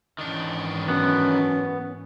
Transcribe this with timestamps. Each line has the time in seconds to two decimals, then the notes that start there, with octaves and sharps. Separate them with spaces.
0.19 G#2 D#3 E3 C#4 D4
0.88 F#2 B3